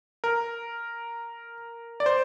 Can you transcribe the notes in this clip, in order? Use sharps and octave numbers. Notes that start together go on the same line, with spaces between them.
A#4
D5
C5